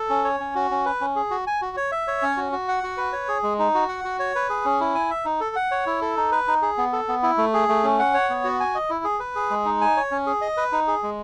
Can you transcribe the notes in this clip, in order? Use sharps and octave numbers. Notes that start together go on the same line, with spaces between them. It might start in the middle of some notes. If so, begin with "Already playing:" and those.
Already playing: A4
C#4
C#5
C#4
F#4
C#4
B4
C#4
G#4
F#4
G#5
F#4
C#5
E5
C#5
C#4
F#4
F#4
F#5
F#4
B4
C#5
G#4
G#3
D#4
F#4
F#5
F#4
C#5
B4
G#4
C#4
E4
G#5
E5
D#4
A4
F#5
C#5
E4
A4
D#4
B4
D#4
G#4
B3
A4
B3
E4
A3
G#4
A3
C#4
F#5
C#5
B3
F#4
G#5
D#5
E4
G#4
B4
G#4
G#3
D#4
G#5
C#5
C#4
G#4
D#5
B4
D#4
G#4
G#3